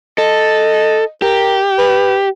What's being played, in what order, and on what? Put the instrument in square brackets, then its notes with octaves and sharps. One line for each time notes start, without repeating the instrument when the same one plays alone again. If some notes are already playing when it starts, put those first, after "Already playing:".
[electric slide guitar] A4 [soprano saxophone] D#5
[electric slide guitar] G4 [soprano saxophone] A#4
[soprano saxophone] B4